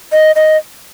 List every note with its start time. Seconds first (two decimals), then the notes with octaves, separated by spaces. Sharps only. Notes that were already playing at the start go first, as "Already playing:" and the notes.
0.12 D#5
0.36 D#5